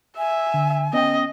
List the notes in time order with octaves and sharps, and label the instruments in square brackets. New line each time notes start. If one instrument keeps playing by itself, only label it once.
[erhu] E5 [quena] G#5
[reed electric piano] D3
[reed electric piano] B3 C#4 G5 [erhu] D#5